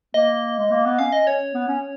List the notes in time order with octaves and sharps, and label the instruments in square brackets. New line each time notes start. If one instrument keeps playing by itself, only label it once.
[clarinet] A#3 [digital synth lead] D#5
[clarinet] G#3
A#3
B3
[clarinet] C#4 [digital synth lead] F5
[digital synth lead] D#5
C#5
[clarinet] B3
C#4